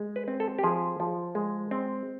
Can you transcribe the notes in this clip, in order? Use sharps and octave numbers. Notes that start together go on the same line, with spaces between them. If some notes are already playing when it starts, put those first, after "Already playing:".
Already playing: G#3
B4
C4
A4
G4
F3 G#4
F3
G#3
C4